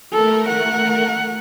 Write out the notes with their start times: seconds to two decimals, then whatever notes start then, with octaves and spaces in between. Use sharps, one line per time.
0.12 A3 A4 A#4
0.49 F#5